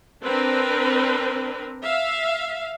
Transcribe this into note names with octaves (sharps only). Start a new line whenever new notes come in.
C4 D4 A#4 B4
E5 F5